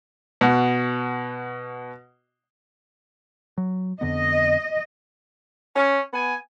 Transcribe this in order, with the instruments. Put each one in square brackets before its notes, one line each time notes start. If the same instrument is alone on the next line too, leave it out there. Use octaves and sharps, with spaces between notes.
[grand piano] B2 F#4
[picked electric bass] F#3
[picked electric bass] F2 D3 B3 [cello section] D#5
[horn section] C#4
B3 G#5